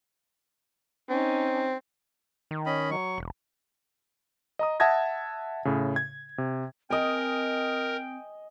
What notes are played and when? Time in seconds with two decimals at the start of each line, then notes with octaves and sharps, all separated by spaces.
1.10 C4 C#4 D#4
2.51 D#3
2.66 C#4 D#5 B5
2.91 F#3 C#6
3.18 E1
4.59 D#5 A#5 D#6
4.80 E5 F#5 A5 D#6 G#6 A#6
5.65 A2 C#3
5.96 G#6
6.38 C3
6.90 C4 A#4 D#5 G5 G#5